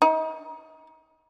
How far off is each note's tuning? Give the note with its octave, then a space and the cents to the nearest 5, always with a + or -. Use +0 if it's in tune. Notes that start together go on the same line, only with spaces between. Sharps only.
D#4 +35